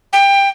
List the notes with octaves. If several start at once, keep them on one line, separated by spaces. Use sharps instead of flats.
G5